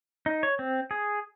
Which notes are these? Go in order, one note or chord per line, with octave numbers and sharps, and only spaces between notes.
D#4
C#5
C4
G#4